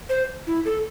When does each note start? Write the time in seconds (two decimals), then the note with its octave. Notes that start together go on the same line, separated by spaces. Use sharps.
0.09 C5
0.47 E4
0.65 A4